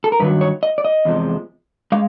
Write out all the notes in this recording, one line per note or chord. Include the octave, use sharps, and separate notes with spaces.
A4
A#4
G2 D#3 F#3 B4
C#5
D#5
D5
D#5
E2 C3 F3 G#3
G#3 F5